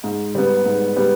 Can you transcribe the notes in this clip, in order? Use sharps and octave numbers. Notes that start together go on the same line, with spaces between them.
G#2
G3 B3
G#2
G3 B3